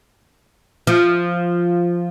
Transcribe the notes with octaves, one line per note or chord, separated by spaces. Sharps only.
F3